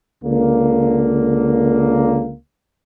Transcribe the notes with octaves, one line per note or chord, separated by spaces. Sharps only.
C#2 D3 A#3